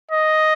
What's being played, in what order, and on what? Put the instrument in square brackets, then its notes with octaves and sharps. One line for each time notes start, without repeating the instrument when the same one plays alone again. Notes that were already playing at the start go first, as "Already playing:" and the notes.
[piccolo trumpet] D#5